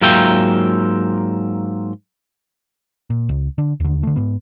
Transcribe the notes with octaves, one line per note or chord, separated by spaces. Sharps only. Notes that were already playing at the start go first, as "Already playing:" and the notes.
G#2 F#3 A#3 F4 E5 G5
A#2
C#2
D3 D4
D#2 D3
D3 A3
G#2 B3